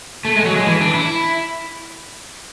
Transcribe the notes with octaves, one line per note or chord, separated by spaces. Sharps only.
A3
G#3
F#3
G#3
E3
D4
E4